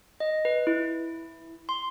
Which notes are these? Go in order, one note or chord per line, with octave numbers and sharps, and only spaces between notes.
D#5
B4
E4
C6